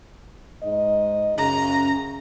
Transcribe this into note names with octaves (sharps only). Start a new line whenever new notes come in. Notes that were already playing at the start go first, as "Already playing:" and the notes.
G#2 D#4 D#5
F#2 C#3 A#5